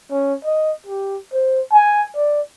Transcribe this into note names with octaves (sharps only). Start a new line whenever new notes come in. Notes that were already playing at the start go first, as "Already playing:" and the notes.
C#4
D#5
G4
C5
G#5
D5